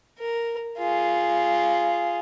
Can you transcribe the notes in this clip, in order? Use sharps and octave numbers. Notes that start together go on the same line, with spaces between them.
A#4
F4 G#4